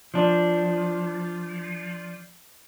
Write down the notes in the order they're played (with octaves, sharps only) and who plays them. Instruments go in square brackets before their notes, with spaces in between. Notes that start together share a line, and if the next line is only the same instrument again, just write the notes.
[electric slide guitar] F3 D4